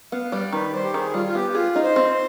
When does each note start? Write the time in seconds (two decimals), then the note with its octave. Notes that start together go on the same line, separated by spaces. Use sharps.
0.12 B3 F5
0.32 G3 D5
0.52 D#3 B4
0.73 G3 C5
0.84 G4
0.94 D#3 G#4
1.14 G3 F4
1.26 F4
1.35 B3 G4
1.50 G4
1.55 F4 G#4
1.76 D#4
1.83 C5
1.96 C4
2.10 C5